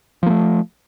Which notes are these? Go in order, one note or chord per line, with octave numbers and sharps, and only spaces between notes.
F3 A3 A#3